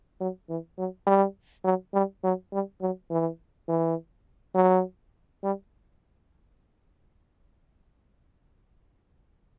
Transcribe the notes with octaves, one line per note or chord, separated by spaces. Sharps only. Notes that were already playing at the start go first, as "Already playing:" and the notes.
F#3
E3
F#3
G3
F#3
G3
F#3
G3
F#3
E3
E3
F#3
G3